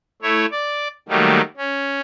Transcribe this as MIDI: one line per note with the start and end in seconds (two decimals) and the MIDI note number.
0.22 0.46 57
0.22 0.46 64
0.22 0.46 73
0.51 0.88 74
1.09 1.41 51
1.09 1.41 54
1.09 1.41 55
1.09 1.41 57
1.09 1.41 58
1.57 2.01 61